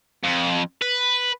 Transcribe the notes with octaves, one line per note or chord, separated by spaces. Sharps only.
F2
B4